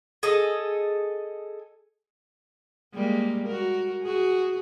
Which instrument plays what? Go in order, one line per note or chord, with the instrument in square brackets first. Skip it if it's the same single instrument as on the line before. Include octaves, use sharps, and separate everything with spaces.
[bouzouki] G#4 A4 D#5
[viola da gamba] G3 G#3 A#3
F#4 A#4
F#4 G#4